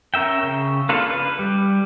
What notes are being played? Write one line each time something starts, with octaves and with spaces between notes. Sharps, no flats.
C#4 A#4 E5 G5
C#3
A#3 D4 F4 A4 B4
B4
G3